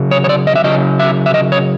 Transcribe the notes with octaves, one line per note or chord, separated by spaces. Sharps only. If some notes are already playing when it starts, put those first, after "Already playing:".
Already playing: C#3 F#3
C#5
C#5
D5
D#5
E5
C#3 F#3 D#5
E5
E5
D#5
C#5